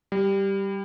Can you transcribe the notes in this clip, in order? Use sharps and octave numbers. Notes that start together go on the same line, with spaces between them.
G3